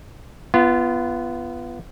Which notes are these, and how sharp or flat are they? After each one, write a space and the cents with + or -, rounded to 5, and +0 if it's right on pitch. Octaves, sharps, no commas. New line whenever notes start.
B3 +0 F4 -30